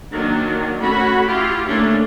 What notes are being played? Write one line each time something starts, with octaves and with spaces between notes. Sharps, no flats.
D#3 F#3 A#3 D4
A3 C#4 F#4 B5
E4 F4 G4
D3 A3 A#3 C#4 D4